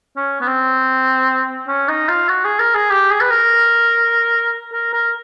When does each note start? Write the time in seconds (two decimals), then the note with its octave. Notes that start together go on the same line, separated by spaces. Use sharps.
0.17 C#4
0.41 B3
0.47 C4
1.68 C#4
1.89 D#4
2.09 F4
2.29 F#4
2.44 G#4
2.60 A#4
2.75 G#4
2.90 G4
3.11 G#4
3.21 B4
3.31 A#4
4.73 A#4
4.93 A#4